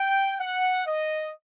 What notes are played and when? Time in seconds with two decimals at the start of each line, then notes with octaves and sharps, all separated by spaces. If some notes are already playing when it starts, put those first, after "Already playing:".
Already playing: G5
0.39 F#5
0.87 D#5